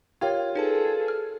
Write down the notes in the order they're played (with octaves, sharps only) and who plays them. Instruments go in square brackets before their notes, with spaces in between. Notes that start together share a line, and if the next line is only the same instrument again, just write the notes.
[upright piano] F4 [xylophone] G4 A#4 C#5 [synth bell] G5 G#6
[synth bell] D#4 B4 A5 [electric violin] G#4 A4
[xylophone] F6